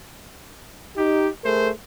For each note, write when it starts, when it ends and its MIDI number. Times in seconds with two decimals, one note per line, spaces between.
0.96 1.28 63
0.96 1.28 67
1.44 1.69 57
1.44 1.69 68
1.44 1.69 70
1.44 1.69 72